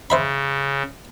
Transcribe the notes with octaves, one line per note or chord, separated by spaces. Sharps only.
C#3 C5 E5 B5